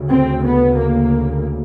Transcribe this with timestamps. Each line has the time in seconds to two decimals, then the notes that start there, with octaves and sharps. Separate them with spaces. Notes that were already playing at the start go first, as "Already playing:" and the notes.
Already playing: D2 C#3
0.10 C4
0.45 B3
0.80 A#3